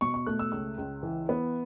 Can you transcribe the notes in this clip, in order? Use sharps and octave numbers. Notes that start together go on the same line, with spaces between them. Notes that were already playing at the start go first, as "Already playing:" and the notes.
B2 C#6
C#6
A3 F#6
E6
C#2 E6
C#2
E3
B3